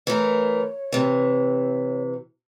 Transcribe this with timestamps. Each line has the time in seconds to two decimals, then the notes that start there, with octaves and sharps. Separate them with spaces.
0.07 E3 A3 A#4 C#5
0.92 C3 E3